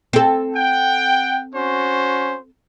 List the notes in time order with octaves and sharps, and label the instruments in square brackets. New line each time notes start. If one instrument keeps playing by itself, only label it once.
[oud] C4 A4
[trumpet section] F#5 G5
C#4 F#4 C5